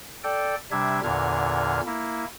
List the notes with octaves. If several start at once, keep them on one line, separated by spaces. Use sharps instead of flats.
A4 D5 G5
C3 G3 D4 E5 G#6
E2 A#2 D3 F6 G#6
A#3 E4